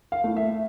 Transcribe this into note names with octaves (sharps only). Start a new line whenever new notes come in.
F5
A3 E4
E5